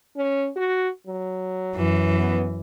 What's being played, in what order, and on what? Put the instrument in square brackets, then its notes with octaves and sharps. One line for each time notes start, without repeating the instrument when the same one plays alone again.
[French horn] C#4
F#4
F#3
[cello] F#2 E3
[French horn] B3